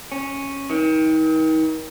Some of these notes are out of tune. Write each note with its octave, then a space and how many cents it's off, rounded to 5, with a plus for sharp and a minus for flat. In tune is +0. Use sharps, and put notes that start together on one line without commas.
C#4 -5
D#3 +35